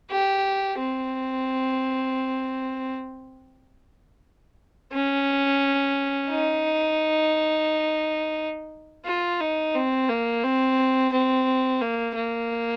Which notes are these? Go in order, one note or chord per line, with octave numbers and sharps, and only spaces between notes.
G4
C4
C#4
D#4
F4
D#4
C4
A#3
C4
C4
A#3
A#3